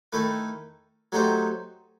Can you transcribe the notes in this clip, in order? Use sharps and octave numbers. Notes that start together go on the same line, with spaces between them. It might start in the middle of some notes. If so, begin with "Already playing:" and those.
D#3 A3 E4 B4
F#3 A3 D#4 G4 C5